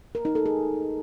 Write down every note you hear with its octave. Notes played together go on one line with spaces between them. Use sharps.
A#4
D#4
A4
G#4